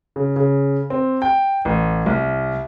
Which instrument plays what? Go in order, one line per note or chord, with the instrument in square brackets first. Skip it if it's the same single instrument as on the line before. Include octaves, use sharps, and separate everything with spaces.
[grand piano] C#3
C#3
C4
G5
A1
C2